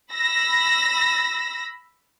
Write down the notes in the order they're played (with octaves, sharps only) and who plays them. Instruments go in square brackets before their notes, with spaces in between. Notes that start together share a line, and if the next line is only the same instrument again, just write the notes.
[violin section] B5 E6 A#6